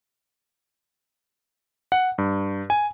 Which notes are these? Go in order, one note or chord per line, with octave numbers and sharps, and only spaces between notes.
F#5
G2
G#5